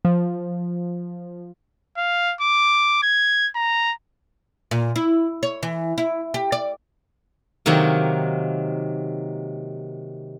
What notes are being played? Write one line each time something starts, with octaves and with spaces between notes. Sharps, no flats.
F3
F5
D6
G#6
A#5
A#2
E4
C#5
E3
E4
G4
D5
C3 D#3 F#3 A#3